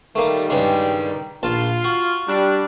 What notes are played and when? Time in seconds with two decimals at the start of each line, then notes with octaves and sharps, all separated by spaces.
0.15 D#3 G3 A3 A#3
0.50 G2 C#3 G#3
1.43 A#1 F4 A5
1.84 F#4
2.27 G3 D4